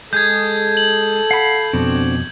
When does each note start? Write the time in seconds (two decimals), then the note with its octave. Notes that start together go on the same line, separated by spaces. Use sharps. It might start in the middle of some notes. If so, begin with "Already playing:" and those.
0.13 G#3 G#4 A4 G6 G#6
0.77 F#7
1.31 F5 F#5 B5
1.73 F2 B2 C4 D4 F#4